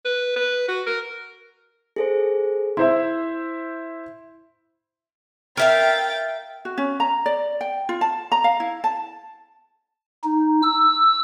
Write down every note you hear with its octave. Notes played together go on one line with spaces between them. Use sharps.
B4
B4
F#4
A#4
G#4 A4 C5
E4 C5 E5 C6
A#4 E5 F5 G5 A6
F#4
C#4
A#5
D5
G5
F4
A5
A#5
F5
E4
A5
D#4
E6